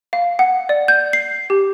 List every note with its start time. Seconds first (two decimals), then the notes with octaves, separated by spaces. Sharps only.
0.13 F5
0.39 F#5
0.69 D5
0.88 G6
1.13 C7
1.50 G4